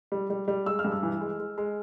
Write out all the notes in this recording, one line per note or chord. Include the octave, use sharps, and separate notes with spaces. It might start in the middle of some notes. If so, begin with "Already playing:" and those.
G3
G3
G3
G#3 E6
F6
G2
E6
E3
G#3
G#3
G#3